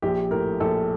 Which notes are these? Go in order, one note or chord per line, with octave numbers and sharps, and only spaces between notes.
A#1 G4
A2 A#4
A#1 A4